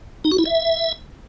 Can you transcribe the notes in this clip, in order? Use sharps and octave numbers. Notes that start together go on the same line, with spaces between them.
D#4
F#4
E4
E5